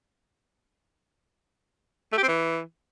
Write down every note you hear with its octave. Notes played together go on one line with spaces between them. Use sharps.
A3
G4
C4
E3